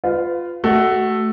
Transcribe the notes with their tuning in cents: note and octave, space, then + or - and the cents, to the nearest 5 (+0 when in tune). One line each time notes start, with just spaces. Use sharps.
F4 +0 B4 +25
A3 -5 F#4 +20